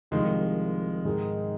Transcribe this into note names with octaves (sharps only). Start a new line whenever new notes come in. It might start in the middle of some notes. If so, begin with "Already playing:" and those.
C2 C3 D#3 F3 G#3
G#2 D#3 G#3 D#4 G#4